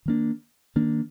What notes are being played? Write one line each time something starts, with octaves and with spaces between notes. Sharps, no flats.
D#3 A#3 D4
D#3 A#3 D4